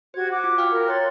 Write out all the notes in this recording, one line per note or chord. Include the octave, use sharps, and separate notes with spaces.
F#4 G4 C5 G#6
F#4 D6
F4
F5 G5 F6
A#4
C#5 A#5 C6 F#6 A6